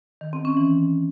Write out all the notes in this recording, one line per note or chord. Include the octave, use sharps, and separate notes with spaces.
D#3
C4
C#4
E3